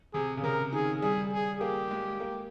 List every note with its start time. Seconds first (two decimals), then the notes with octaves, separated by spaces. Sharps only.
0.13 C3 G#4
0.37 C#3
0.43 C3 A#4
0.73 D#3 G#4
1.02 G3 G#4
1.32 G#4
1.61 A#3 G4
1.91 G#3
2.20 A#3